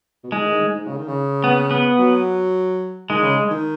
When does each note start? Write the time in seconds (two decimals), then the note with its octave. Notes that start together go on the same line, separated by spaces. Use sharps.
0.24 B2
0.32 G#2 G#3
0.46 D#3
0.60 G#2
0.74 G#2
0.87 C#3
0.97 D#3
1.08 C#3
1.44 B3
1.71 B3
1.99 F#3
3.10 D#3 G#3
3.23 C#3
3.51 D#3